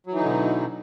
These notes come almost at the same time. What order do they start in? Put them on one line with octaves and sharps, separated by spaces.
F#3 E3 D#4 D3 B2